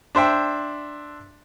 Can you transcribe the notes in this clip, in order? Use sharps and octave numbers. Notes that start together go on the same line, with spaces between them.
D4 C5 E5 G5